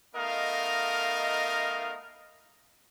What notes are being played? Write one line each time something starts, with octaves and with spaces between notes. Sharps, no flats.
A3 B3 D#4 A#4 D#5 F5